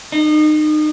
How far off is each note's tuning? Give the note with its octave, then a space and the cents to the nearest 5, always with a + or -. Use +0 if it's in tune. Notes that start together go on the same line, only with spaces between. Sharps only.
D#4 -30